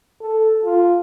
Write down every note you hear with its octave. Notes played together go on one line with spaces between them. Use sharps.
A4
F4